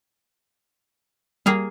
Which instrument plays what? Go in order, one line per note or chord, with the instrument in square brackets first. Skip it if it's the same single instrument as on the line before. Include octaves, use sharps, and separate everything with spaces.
[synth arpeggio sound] G3 [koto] A#3 G#4 F5